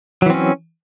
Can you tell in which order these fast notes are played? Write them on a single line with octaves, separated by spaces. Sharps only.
F#3 E3 C4 C#4